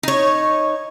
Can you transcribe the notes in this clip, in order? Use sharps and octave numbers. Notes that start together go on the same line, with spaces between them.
D#4 C#5